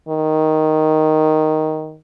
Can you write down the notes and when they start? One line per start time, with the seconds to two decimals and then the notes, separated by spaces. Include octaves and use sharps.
0.09 D#3